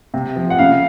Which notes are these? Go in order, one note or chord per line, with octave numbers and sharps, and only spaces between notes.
C3
F3
F#5
C#3 F5